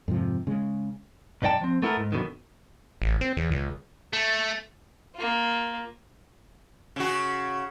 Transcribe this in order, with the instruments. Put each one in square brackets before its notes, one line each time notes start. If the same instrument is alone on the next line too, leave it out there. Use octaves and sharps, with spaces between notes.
[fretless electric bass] F2 G#2 C3 F3
C#3 G#3
[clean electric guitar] B1 G2 D#4 D5 G5 A5
F3 C4
A3 B3 E4 A4 A#4
G#2
F#2 B2 D3 D#3
[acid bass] A1
C4
E2
C#2
[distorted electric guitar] A3
[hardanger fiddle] A#3 F4
[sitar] C#3 F#4